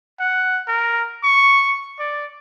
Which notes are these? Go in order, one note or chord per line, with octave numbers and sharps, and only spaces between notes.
F#5
A#4
C#6
D5